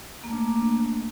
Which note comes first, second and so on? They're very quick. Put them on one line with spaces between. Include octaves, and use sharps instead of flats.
A#3 A3 D4